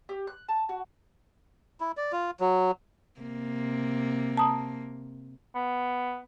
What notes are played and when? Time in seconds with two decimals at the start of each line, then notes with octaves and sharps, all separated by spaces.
0.09 G4
0.27 F#6
0.49 A5
0.69 F#4
1.81 E4
1.97 D5
2.12 F4
2.40 F#3
3.21 C3 A#3
4.37 A5 A#5 D#6
5.55 B3